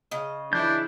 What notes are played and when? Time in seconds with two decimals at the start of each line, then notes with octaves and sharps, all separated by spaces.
0.11 C#3 D#5
0.53 E3 D4 E4 G6